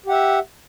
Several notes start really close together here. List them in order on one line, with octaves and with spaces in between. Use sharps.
G4 F#5 E5